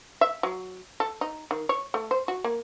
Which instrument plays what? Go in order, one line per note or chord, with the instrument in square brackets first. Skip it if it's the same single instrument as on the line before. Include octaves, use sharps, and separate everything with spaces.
[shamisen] E5
F#3
A4
D#4
D#3
C#5
A3
C5
F#4
A#3